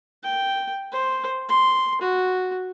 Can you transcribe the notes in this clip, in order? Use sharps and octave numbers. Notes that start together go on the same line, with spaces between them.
G5
C5
C6
F#4